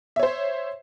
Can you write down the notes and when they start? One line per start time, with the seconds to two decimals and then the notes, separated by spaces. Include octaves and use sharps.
0.16 E5
0.19 C#5
0.23 C5